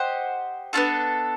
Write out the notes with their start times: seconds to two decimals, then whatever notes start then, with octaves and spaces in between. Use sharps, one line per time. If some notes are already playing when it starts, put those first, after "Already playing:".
Already playing: G4 C5 D#5 F#5
0.73 B3 D4 F4 A4